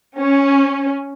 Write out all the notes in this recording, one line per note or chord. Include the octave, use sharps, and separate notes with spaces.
C#4